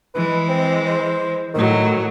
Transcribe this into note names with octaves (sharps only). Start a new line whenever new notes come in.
E3 G#3 B4
C4
C5
A2 D#3 F#3